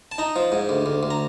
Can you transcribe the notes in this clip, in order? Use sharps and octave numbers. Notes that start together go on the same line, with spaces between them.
A5
D#4 A#5
F3
G#2
D2
D2
D2
A#5